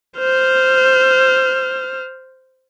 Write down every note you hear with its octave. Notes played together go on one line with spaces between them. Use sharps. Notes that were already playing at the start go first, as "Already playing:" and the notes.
C5 F6